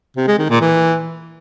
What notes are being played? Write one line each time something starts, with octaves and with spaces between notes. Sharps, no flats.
C3
G#3
D#3
A#2
E3